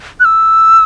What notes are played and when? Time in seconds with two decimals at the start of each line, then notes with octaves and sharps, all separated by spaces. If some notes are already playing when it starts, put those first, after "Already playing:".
0.20 F#6
0.25 E6